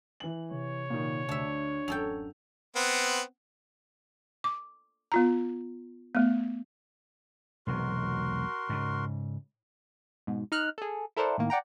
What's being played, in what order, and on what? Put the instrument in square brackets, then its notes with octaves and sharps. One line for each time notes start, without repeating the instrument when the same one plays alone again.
[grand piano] E3 F#7
[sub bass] C3 [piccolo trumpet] C#5
[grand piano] A#2 D#3
[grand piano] D2 [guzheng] D4 E5
[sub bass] D1 [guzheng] F#2 A4 G5 [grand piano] F7
[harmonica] B3 C4 F#5
[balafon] D6
B3 F4 A#5
A3 B3
[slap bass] E1 B1 C3 [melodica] F#4 A#4 C6
[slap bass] G#2 C#3
[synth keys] G#2 B2
D#4 F6 F#6
G#4 A4
E4 A4 A#4 C5 D5 F#5
A2 D#3 A#3
D5 F#5 G5 A#5